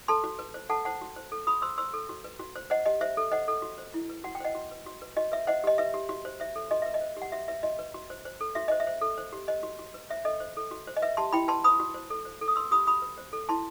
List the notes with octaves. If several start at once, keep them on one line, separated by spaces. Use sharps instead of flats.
A4 A5 C6
F#4
B4
C5
A4 F#5 A5
C5 F#5 A5
F#4
C5
A4
F#4 B5 D#6
C5 C6 E6
C5 C6 E6
A4
F#4
B4
F#4
C5
C5 D#5 F#5
G4 D#5
C5 E5
A4
C5 D#5 F#5
A4
F#4
C5
E4
B4
F#4 F#5
G5
C5 D#5 F#5
F#4
B4
F#4
B4
F#4 D#5
B4 E5
C5 D#5 F#5
G4 D#5
B4 E5
G4
F#4
C5
C5 E5
A4
F#4 D#5
B4 E5
D#5
C5
G4
F#5
F#4 E5
B4 E5
F#4 D#5
B4
F#4
C5
C5
A4
F#4 E5
C5 D#5
E5
C5
A4
C5
G4
C5 D#5
F#4
F#4
B4
C5 E5
A4 D#5
C5
A4
F#4
C5
D#5
B4 E5
G4 A5 C6
E4 G5 B5
B4 A5 C6
B4 B5 D#6
F#4
C5
A4
C5
A4
D#6
B4 C6 E6
G4 B5 D#6
F#4 B5 D#6
B4
C5
A4
E4 A5 C6